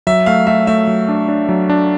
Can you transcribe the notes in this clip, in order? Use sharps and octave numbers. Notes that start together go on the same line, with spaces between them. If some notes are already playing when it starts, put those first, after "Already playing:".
F#3 E5
A3 F5
A3 E5
A3 E5
F#3
D4
D4
F#3
D4